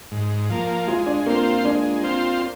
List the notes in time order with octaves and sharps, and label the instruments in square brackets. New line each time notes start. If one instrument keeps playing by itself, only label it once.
[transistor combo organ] G#2
F3 A#3
[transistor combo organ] G#3 [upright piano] F4
[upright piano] D4
[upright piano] A#3 [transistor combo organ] C4 F4 C5
[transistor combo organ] G#3 [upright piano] D4
[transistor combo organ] C4 F4 C5